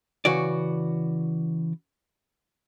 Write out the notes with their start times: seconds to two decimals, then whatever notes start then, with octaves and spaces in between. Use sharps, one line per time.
0.25 C#3 E3 F#4 D5